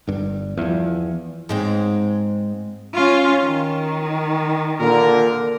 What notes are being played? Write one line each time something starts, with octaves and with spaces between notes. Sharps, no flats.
G1 G2
E2 F3
G#2 G#3 C4
C#4 F4
D#3
A#2 D3 A#4